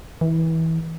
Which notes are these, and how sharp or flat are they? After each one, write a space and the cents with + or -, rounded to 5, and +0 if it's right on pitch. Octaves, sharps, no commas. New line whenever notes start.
E3 -25